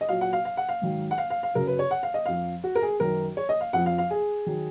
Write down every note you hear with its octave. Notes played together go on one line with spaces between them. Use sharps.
D#5
A#2 F#3 F5
F#5
F5
F5
F#5
F5
G#2 D#3 F#3
F#5
F5
F5
F5
F#2 C#3 F#3 A#4
B4
C#5
F#5
F5
D#5
F2 F3 F5
F#4
A#4
G#4
F#2 D#3 F#3 A#4
C#5
D#5
F5
F2 F3 F#5
F5
F5
G#4
D#3 F#3